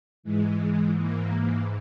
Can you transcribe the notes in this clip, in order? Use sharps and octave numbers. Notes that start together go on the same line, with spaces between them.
G#2 E3 G#3
A#3